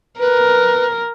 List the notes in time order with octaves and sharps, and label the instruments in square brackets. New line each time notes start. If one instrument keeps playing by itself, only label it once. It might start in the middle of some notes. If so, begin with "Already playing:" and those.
[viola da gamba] A#4 [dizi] B4